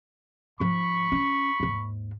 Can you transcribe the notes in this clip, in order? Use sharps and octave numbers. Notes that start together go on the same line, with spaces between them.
G#2 F3 B5 C#6
C#4
D#2 G#2